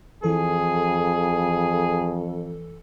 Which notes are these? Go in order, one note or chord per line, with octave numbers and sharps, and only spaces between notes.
F2 E3 G#4 A4